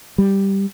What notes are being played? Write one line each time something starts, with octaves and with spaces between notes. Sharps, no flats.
G3